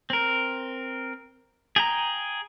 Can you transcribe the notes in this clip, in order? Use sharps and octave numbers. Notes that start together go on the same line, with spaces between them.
C4 A#4
G#4 G5 A#5